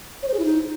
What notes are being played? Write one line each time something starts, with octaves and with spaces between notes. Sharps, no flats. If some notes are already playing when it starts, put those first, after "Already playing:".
C#5
C5
G#4
E4
D#4